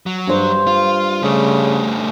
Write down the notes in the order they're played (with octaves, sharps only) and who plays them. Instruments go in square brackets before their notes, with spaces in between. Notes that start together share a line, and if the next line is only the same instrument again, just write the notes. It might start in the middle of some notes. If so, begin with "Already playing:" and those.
[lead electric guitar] F#3
[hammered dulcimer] G2 C5
[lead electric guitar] F4
[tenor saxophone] C#3 [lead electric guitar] G3 A3